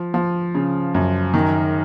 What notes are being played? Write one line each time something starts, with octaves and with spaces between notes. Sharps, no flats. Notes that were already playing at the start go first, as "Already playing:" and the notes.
Already playing: F3
F3
C#3
F#2
D#3